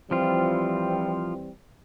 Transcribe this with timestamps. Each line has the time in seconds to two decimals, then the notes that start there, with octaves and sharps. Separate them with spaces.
0.11 E3 F3 G3 C4 F4